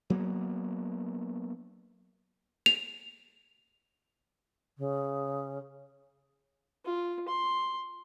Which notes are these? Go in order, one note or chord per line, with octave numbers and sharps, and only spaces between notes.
F#3 A#3 B3
F7
C#3
F4
C6